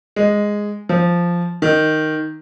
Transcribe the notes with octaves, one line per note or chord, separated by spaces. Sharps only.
G#3
F3
D#3